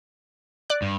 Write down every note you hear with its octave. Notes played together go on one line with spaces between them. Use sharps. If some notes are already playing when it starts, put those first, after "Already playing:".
D5 F#6
G2